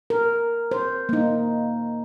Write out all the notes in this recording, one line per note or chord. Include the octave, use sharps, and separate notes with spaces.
A#4
C5
A#3 D#4